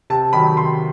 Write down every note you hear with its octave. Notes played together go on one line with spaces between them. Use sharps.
C3 A5
D#3 F#3 B5
C3 C6